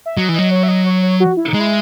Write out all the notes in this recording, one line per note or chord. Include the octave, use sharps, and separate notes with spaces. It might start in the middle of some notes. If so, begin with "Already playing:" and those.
E5
F#3 D#5
E3
F#3 D#5
C#5
E5
D#5
C#5
C#5
F#4
E4
D#4
G#3
E4